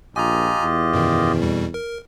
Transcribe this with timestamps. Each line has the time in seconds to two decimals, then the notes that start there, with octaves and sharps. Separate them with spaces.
0.16 A#1 F4 G4 D#5 G#5 A#5
0.61 E2
0.93 F#2 B2 D#3
1.42 F2 B2 G3
1.74 A#4